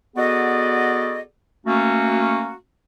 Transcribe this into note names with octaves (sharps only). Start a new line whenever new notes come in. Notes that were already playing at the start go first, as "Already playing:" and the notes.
B3 F#4 G#4 A4 D5 D#5
A3 A#3 C#4 F#4